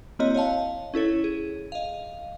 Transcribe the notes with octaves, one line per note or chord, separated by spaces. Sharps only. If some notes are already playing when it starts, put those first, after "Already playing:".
A#3 C4 E4 F#4 C#5 D#5
C#5 D#5 F5 A5
C#4 E4 A4 C#5
G#4
D#5 F5